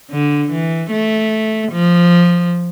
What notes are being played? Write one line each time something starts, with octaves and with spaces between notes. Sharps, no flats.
D3
E3
A3
F3